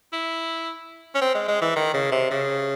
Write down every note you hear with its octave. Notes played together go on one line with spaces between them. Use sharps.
E4
C#4
C4
G#3
G#3
E3
D#3
C#3
C3
C#3